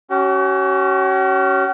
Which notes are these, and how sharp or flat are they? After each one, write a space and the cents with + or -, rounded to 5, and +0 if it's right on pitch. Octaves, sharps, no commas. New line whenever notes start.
C#4 +0 F#4 +45